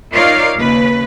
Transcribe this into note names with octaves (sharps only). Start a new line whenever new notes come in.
D#4 F4 A#4 C#5 D5 F5
D#2 C#3 B4